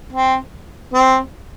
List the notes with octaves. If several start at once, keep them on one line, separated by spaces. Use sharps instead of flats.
C4
C4